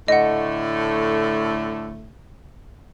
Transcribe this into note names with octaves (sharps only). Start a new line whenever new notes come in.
A2 D3 A3 D#5 F#5